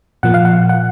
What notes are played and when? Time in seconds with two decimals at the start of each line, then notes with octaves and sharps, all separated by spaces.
0.23 A#2 F3 A#3 F#5
0.34 F5
0.45 F#5
0.69 F#5